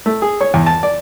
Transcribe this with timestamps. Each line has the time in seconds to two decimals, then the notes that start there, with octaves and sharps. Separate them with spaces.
0.06 A3
0.22 G#4
0.41 C#5
0.54 E2
0.66 A5
0.83 D5